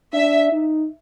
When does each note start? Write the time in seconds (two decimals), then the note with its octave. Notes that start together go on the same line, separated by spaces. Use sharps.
0.13 D4 E5
0.52 D#4